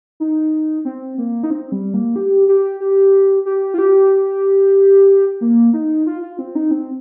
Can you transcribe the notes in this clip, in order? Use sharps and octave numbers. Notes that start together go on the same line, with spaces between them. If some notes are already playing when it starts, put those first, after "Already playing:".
D#4
C4
A#3
D#4
C4
G3
A#3
G4
G4
G4
G4
F4
G4
A#3
D#4
F4
F4
C4
D#4
C4